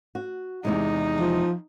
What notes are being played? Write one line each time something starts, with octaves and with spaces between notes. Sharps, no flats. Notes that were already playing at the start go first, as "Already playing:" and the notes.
F#4
E2 C3 G#3 D#4
F3